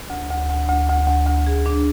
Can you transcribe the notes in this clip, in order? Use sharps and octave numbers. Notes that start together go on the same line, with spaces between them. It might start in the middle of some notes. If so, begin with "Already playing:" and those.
D2
D2
D2
D2
D2
D2
D2
G#4
D4